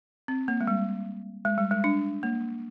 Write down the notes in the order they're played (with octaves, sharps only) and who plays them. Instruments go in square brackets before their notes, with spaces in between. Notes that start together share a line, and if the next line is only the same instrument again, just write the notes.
[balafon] C4
A#3
G#3
G3
G#3
G3
G#3
D4
A#3